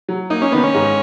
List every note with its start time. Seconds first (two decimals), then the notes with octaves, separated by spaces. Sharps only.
0.08 F#3
0.30 A#3 D#4
0.42 C#4
0.52 D#3 B3
0.63 C#4
0.74 G#2